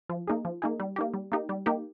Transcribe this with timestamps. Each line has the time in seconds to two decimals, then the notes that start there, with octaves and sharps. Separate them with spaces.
0.09 F3
0.27 A#3 D#4 G#4
0.45 F3
0.62 A#3 D#4 G#4
0.80 G3
0.96 A#3 D#4 G4
1.14 G3
1.32 A#3 D#4 G4
1.49 G3
1.66 A#3 D#4 G4